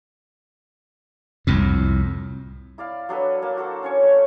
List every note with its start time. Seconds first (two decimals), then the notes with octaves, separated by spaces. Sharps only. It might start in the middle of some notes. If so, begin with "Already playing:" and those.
1.47 C2 F2 A2
2.78 E4 D5 F5
3.09 F#3 D4 A4 B4
3.42 A#3 A5
3.57 F#4 A4 C5
3.83 C#4 C#5 C#6
4.03 A3